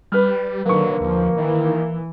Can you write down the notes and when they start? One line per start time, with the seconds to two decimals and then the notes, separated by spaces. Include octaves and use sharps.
0.12 G3 B4 F6
0.65 D3 D#3 F#3 A#3 B4 C#6
1.01 D#2 F3
1.38 D#3 E3